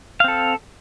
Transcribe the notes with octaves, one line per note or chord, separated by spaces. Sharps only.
C4 A4 F5